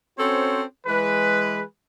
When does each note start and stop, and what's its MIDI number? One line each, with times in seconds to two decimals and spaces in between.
0.19 0.63 60
0.19 0.63 61
0.19 0.63 66
0.19 0.63 69
0.19 0.63 72
0.19 0.63 73
0.87 1.63 52
0.87 1.63 56
0.87 1.63 68
0.87 1.63 71